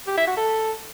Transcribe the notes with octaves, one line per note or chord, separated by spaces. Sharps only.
G4
E5
F#4
A4